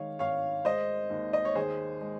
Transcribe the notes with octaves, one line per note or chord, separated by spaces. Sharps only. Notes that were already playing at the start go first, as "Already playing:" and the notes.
Already playing: D#3 G#3 C#5 F5
G#1 C#5 F5
G#3 C5 D#5
D#2
D#5
C#5
D#3 G#4 C5
G#3